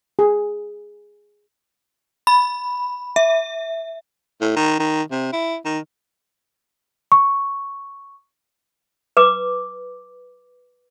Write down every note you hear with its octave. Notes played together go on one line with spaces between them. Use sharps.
G#4
B5
E5
A2
D#3
D#3
C3
E4
D#3
C#6
B4 D6